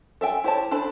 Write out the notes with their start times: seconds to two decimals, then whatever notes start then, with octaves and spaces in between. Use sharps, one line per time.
0.21 A4 E5 G5 G#5
0.44 E4 G4 C5 C#5 A5
0.71 D4 A4 C5 B5